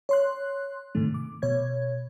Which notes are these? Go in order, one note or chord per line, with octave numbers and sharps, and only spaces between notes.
C#5 C6 F#6
G#2 C3 D#3 A3
D6
B2 C#5 G#6